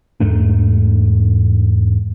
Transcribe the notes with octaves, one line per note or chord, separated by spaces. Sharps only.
E2 G#2 A3 D4